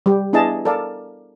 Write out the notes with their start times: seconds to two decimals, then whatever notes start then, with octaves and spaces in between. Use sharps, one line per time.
0.06 G3 G4
0.33 B3 D4 E4 G#4 D#5 A5
0.65 A4 A#4 D5 F5 A5